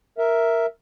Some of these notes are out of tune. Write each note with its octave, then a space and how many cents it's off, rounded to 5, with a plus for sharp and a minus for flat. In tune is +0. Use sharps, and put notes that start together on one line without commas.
A#4 +0 E5 +0